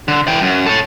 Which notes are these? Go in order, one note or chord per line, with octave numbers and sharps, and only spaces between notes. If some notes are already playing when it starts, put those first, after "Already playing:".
D3
E3 G5
F#2
A4 C#5